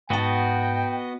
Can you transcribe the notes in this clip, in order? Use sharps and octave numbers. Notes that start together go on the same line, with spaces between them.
G#2 B3 F#4 D#5 G5 A5